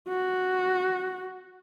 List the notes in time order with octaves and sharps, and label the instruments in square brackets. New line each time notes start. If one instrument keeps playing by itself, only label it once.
[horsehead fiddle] F#4